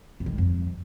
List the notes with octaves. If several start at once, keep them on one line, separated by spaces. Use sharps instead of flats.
F2
D#3
G3
F2